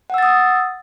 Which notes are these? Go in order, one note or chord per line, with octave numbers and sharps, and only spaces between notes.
F#5 D#6 E6 A6